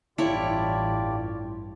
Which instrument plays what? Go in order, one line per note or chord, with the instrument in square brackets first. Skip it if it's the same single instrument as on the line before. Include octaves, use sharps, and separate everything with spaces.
[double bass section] A1 G2 [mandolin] D4 C#5 [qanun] E4 [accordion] F4 G4 D5